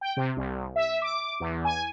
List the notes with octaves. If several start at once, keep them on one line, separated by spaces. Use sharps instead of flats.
G5
C3
C2
E5
D6
E2
G#5